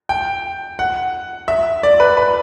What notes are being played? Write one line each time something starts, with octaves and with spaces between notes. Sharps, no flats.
G5
F#5
E5
D5
B4
B4